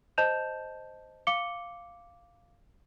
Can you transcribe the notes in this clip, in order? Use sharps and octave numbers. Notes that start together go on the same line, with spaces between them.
C5 D#5 A5 G6 E7 F7
F5 D6 C#7 G7